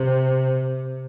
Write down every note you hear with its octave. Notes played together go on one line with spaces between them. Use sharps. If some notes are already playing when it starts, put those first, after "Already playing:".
Already playing: C3